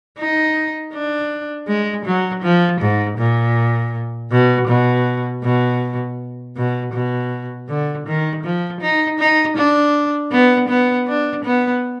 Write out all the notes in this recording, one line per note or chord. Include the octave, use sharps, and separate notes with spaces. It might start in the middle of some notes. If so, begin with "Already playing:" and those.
D#4
D4
G#3
F#3
F3
G#2
A#2
B2
B2
B2
B2
B2
D3
D#3
F3
D#4
D#4
D4
B3
B3
D4
B3